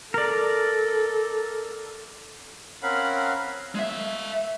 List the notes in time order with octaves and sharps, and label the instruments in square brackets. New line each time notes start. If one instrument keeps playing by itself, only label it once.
[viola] A4 [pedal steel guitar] A#4 D5
[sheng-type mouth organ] C4 C#4 A#4 F5 F#5 B5
[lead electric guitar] G#3 E5